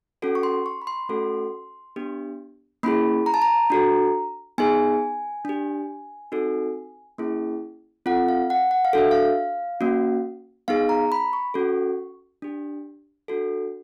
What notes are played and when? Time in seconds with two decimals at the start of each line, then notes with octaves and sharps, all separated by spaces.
0.22 C#4 F#4 A4
0.35 C#6
0.43 C6
0.66 C#6
0.82 B5
0.87 C6
1.09 A3 C#4 F#4 A4
1.96 B3 D4 G4
2.83 A#3 C#4 E4 G#4 B5
3.26 A#5
3.34 A5
3.42 A#5
3.70 D4 F#4 A4
4.58 B3 D#4 G#4 G#5
5.45 D4 G4
6.32 C4 D#4 F#4 A4
7.18 A#3 C#4 E4 G#4
8.06 C4 F4 A4 F#5
8.29 F5
8.50 F#5
8.71 F#5
8.85 F5
8.93 D4 F#4 A4 E5
9.11 F5
9.81 A#3 C#4 F#4
10.68 B3 D#4 G#4 F5
10.89 A#5
11.12 B5
11.33 C#6
11.54 C#4 F#4 A4
12.42 D4 G4
13.28 D4 F#4 A4